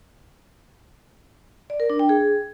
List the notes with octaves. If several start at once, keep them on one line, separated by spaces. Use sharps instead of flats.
D5
A#4
D4
G5
G#4